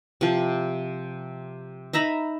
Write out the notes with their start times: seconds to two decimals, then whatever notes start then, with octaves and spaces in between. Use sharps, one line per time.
0.21 C3 F3
1.93 D#4 E5 A#5 B5